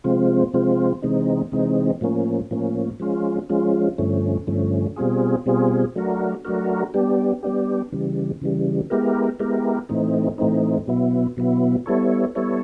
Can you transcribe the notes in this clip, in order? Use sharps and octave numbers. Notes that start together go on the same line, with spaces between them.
C3 F3 G#3 C4 F4
C3 F3 G#3 C4 F4
C3 E3 G#3 C4 D#4
C3 E3 G#3 C4 D#4
A2 F3 A#3 C#4
A2 F3 A#3 C#4
F3 G#3 C#4 F4
F3 G#3 C#4 F4
G2 D3 F3 A3 C#4
G2 D3 F3 A3 C#4
B2 G3 C4 F4 G#4
B2 G3 C4 F4 G#4
F#3 A3 D4 F#4 A#4
F#3 A3 D4 F#4 A#4
G3 B3 D4 G4
G3 B3 D4 G4
C#3 E3 G3
C#3 E3 G3
G#3 B3 E4 G4 A#4
G#3 B3 E4 G4 A#4
A2 E3 A3 C4 D#4
A2 E3 A3 C4 D#4
B2 F#3 B3 E4
B2 F#3 B3 E4
G3 B3 E4 A4 C#5
G3 B3 E4 A4 C#5